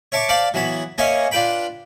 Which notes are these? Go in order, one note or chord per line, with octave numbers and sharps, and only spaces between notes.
C#5 E5 A5 C#6 D6
C5 D5 F5 A5 B5
E3 F#3 B3 B5
A#3 C#4 C#5 D#5 E5 G#5
D4 F4 B4 G5 B5